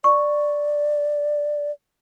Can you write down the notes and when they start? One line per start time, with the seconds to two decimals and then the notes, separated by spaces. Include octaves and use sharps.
0.04 D5 C#6